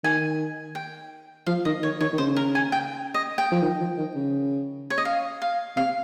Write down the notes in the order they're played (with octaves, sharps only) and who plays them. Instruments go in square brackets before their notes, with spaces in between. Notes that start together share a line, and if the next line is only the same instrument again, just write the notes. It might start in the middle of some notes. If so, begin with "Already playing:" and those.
[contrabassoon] D#3 [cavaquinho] G#5
[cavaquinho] G5
[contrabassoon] F3 [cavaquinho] F5
[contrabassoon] D#3 [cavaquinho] D#5
[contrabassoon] D#3 [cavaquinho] C#5
[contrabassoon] D#3 [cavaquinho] C#5
[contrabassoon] D#3
[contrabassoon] C#3 [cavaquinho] C5
[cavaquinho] A#4
G#5
G5
D#5
G5
[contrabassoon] F3
D#3
F3
D#3
C#3
[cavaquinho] C#5
D#5
F5
F5
[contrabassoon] C3 [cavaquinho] F5